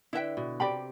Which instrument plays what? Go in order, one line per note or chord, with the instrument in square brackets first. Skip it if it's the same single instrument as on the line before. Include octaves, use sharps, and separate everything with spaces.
[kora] D3 [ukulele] E4 B4 E5 G5
[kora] B2
[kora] C3 [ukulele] G4 D5 G5 B5